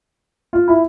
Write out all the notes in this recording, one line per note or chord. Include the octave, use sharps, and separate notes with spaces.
F4
E4